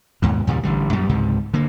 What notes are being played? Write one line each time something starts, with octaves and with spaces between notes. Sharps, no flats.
D#2 G#2 B2
D#2 A#2 C#3 G3
A1 D3 G3
F#2 A#2 G3
C#2 G#2 C3
D3 A#3